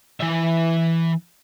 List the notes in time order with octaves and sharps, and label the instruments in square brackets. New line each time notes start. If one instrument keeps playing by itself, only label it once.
[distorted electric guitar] E3 E5